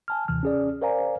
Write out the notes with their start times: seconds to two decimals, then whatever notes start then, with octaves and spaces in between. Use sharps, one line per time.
0.08 G#5 A5 F6
0.28 D#2 C3 E3 F6
0.43 C#4 G#4 D5
0.82 A#4 C5 D5 F5 G#5 A#5